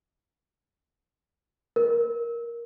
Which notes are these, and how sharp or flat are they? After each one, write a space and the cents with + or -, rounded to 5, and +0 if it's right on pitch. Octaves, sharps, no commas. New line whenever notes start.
A#4 +10